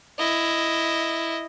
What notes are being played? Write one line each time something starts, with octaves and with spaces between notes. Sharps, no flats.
E4 D#5